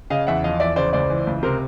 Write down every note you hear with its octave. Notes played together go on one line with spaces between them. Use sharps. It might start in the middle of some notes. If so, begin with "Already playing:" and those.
C#3 D#5 F5
E2 E5 F#5
F3 D#5 F5
E2 D5 E5
C#3 C5 D5
C#2 C5 D5
E3
C#2
C3 A#4 C5